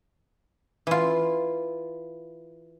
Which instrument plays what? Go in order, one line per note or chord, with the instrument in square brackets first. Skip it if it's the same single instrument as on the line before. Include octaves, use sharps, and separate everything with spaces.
[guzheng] E3 F4